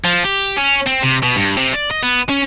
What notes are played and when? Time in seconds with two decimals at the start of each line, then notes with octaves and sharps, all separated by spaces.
0.05 F3
0.24 G4
0.57 C#4
0.86 C4
1.02 C3
1.23 B2
1.36 G2
1.57 C3
1.74 D5
1.91 D#5
2.03 B3
2.29 C#4